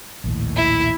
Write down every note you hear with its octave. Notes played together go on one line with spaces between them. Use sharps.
A#1 D#2 A2
E4